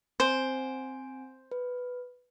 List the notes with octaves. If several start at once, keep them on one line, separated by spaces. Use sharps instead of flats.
C4 C5 G#5 D7
B4